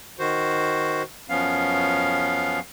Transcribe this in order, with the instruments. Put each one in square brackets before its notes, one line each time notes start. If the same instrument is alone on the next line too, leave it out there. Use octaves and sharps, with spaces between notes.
[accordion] D#3 F#4 C5
F#2 F3 B3 C#4 F5